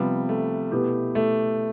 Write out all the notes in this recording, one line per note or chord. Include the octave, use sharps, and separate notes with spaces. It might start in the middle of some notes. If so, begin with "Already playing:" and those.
Already playing: C3 F3 G3 B3
A3
B2 B3 E4 G4
A3